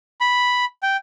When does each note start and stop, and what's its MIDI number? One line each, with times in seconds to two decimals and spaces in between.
0.21 0.65 83
0.83 0.97 79